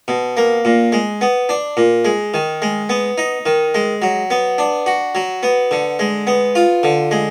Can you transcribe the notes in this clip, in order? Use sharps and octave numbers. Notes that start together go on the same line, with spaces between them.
B2
A#3
A#2
G#3
B3
D4
A#2
G#3
D#3
G#3
B3
D#4
D#3
G#3
F#3
B3
D4
F#4
F#3
B3
D3
G#3
B3
F4
D3
G#3